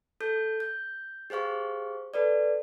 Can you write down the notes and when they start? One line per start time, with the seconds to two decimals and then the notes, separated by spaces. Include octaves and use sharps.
0.20 A4 G6
0.60 G6
1.30 G4 G#4 C5 F5 C#6
2.14 A4 B4 D5